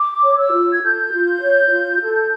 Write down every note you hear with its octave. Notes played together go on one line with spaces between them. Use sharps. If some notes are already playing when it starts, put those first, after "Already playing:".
Already playing: D6
C#5
E6
F4
G#6
A4 G6
F4
C#5
F4
A4